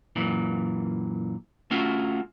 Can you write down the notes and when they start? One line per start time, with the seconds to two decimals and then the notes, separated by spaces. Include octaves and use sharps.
0.16 F#2 A#2 E3
1.71 A3 C#4 F4 F#4